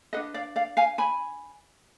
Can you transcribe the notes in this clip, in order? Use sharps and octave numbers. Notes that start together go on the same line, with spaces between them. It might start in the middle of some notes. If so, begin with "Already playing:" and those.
D4 G#4 B4 D#5 F#5
D5 F5
D5 F5
F5 G#5
G#5 B5